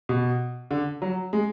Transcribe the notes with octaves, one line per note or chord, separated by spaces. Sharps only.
B2
D3
F#3
G#3